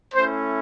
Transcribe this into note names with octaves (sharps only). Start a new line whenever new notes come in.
A3 C#4 E4 C5